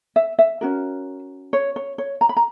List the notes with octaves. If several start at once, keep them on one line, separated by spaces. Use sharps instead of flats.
E5
E5
C#4 F#4 A#4
C#5
C#5
C#5
A#5
B5
A#5